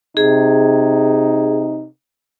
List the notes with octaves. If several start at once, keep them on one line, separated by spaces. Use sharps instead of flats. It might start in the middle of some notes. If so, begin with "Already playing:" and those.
C3 D#4 G#4